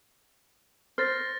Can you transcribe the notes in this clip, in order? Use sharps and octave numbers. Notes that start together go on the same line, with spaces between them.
C5 F6 A6 A#6